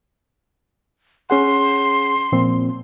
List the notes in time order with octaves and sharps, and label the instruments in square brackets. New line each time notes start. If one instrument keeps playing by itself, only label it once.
[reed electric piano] C#4 G#4 F#5 [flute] C6
[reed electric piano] A#2 F3 C4